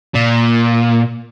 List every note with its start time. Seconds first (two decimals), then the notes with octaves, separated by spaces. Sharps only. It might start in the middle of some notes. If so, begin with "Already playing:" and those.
0.14 A#2